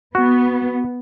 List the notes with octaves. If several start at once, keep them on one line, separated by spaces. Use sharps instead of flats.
B3 F#4